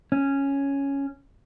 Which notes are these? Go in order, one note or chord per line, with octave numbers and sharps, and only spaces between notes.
C#4